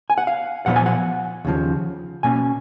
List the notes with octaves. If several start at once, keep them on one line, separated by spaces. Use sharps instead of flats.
G#5
F#5
F5
A#2 F3 B3 F#5
G#5
F#5
D#2 C#3 F3
B2 A#3 C#4 G#5